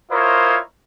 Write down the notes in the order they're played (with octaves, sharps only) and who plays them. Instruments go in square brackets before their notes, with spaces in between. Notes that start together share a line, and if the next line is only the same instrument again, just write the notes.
[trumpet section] E4 F4 A#4 C5 C#5 D#5